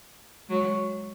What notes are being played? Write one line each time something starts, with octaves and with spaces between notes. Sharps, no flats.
F#3 G#3